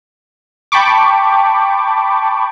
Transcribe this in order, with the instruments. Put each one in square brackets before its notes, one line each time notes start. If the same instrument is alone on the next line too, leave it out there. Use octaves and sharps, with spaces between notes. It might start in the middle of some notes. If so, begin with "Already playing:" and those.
[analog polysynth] G5 A5 B5 C#6 D6